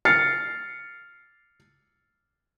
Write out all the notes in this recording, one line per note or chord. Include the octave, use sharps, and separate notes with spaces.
F6 A6 C7 C#7